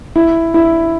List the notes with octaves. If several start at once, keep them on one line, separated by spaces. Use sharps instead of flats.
E4
E4